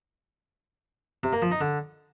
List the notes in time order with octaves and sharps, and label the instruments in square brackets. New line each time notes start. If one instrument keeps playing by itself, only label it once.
[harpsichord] C3
A#3
F3
D#4
D3